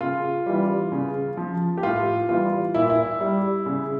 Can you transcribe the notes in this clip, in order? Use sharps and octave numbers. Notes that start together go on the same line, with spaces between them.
C#3 F4
E3 G3
C#3
F3
G4
A2 F4
E3 G3 F4
A#2 E4
E4
G3
C#3